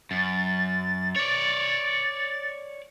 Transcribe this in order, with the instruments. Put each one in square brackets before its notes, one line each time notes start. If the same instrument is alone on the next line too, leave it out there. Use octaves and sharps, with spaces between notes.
[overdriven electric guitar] F#2 [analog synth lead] A6
[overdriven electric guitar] C#5 D5 [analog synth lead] A6